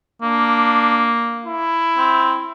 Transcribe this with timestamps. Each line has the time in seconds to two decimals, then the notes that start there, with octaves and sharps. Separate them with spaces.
0.22 A#3 D4
1.45 E4
1.98 C4